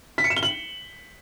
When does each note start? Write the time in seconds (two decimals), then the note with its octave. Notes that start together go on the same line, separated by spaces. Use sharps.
0.18 B6
0.24 C#7
0.30 E7
0.36 G7
0.43 F#7